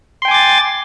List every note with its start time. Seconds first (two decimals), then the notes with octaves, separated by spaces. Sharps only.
0.22 C6
0.25 G5
0.28 G#5
0.31 D6
0.34 A6